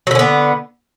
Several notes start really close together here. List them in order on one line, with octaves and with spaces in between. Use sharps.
F#3 D3 C#4 B3